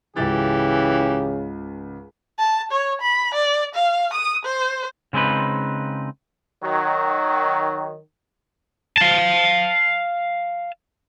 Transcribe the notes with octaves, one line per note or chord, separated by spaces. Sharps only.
C#2 G#2 C#3 E3 G4 A6
A5
C#5
B5
D5
F5
D#6
C5
C#3 G#3 C4 D#4 B4
D#3 F#3
F5 A5